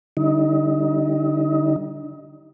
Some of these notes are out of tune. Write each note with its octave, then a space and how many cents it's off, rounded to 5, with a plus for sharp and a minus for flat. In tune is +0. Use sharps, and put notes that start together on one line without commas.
D3 +0 G3 -15 D#4 +30